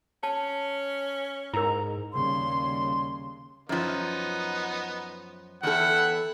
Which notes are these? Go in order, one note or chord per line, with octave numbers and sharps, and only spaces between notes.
C#4 A5
G#2 E4 A#4 A#5
D#2 C#3 G3 C6
F#2 F3 B3 D#4
E2 E4 A4 F#5 G5